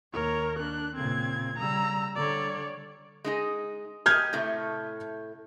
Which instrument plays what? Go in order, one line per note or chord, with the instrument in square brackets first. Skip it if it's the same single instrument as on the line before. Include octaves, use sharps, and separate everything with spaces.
[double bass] D#2 [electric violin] A#4 C#5
[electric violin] D4 F#6
[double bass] A#2 C#3 [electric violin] C4 G#6
[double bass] C#3 G3 [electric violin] A#5 E6
[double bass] D3 G3 [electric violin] C#5 D5
[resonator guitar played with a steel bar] G#3 D#4 G#4
[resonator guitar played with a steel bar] G4 D#5 [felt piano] F6 G6 G#6
[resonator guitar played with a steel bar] A2 C3 A3